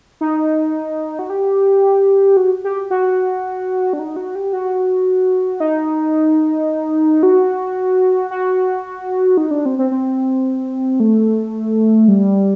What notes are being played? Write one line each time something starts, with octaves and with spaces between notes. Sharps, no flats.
D#4
F#4
G4
F#4
G4
F#4
D4
D#4
F#4
G4
F#4
D#4
F#4
F#4
D#4
D4
C4
C4
C4
A3
G3